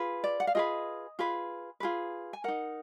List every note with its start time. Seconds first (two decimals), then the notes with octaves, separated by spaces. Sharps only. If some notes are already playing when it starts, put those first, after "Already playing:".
Already playing: F4 G#4 B4
0.24 D5
0.40 F#5
0.47 F5
0.55 F4 G#4 B4 D#5
1.19 F4 G#4 B4
1.80 F4 G#4 B4
2.33 G#5
2.44 D#4 A#4 F#5